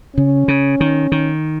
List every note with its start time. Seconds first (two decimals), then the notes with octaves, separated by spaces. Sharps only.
0.17 C#3 C#4
0.48 C#3
0.81 D#3
1.12 D#3